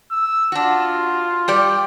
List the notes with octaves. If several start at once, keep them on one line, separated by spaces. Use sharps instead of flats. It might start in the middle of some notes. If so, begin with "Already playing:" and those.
E6
D4 F4 F#4
G3 G4 D5